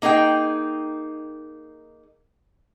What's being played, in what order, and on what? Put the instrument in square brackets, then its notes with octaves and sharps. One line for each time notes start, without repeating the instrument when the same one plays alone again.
[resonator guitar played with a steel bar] A#3 D#4 G#4 A4 G5